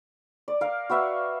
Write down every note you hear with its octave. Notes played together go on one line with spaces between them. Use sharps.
D5
A#4 F5
F#4 B4 E5 F5